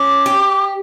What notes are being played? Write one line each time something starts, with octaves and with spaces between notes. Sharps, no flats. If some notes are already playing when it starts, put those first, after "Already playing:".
Already playing: C#4 D6
G4